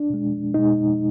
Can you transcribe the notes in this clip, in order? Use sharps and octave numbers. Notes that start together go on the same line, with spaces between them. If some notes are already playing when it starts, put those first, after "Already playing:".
Already playing: D4
B2 G#3
B2 G#3 D#4